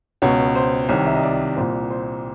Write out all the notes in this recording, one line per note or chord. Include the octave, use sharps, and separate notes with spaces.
C#2 B2 C#5
C5
C2 C3 D#3 C#5
E5
D#5
D5
C2 A#2 C5
C5